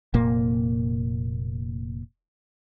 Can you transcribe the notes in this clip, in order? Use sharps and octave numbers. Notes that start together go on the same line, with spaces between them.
F1 A#2 A#3